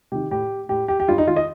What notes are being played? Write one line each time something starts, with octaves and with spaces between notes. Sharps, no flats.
C3 D#3 G4
A2 G4
A2 G4
G4
G4
G2 F4
D#4
D#3 F4
D#5